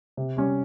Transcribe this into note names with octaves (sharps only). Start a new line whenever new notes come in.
C3
G3 C#4